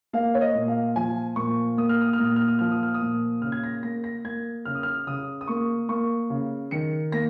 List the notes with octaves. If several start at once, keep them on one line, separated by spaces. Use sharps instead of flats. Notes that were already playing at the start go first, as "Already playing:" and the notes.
A#3 F5
C#5
D#5
A#2
F5
F3 G#5
A#2 C#6
A#3 D#6
F6
D#6
F6
A#2
D#6
F6
D#6
F3 F6
D#6
F6
D#6
A#2
C#3 F6
G#6
A#6
A#3 A#6
A#6
A#3 G#6
C#3 F6
D#6
F6
C#3 D#6
D#6
A#3 C#6
A#3 C#6
C#3
D#3 C#7
A#3 A#6